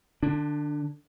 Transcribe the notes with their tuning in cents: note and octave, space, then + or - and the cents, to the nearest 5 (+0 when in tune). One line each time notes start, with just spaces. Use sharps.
D3 +30 D4 +0